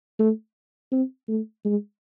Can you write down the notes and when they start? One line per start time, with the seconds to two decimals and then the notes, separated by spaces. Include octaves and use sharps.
0.19 A3
0.92 C4
1.29 A3
1.65 G#3